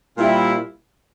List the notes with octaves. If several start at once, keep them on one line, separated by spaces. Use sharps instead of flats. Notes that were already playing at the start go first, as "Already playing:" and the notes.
A#2 G3 C4 E4